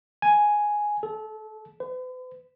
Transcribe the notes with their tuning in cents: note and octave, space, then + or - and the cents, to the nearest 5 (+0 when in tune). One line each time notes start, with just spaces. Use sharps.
G#5 +5
A4 -25
B4 +45